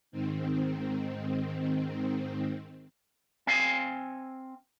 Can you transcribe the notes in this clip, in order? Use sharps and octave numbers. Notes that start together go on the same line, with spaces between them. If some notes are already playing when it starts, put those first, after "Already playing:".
G#2 D#3 C4
C4 F5 G#5